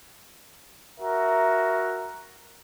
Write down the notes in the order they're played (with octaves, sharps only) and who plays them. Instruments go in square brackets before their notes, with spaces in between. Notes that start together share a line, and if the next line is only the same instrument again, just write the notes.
[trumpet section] F#4 A#4 E5